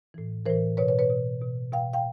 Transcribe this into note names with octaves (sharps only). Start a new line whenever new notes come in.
A2 E3
A2 E3 A#4 C5
B2 B4 C#5
B4 C#5
B4 C#5
B2
B2
B2 F5 G5
F5 G5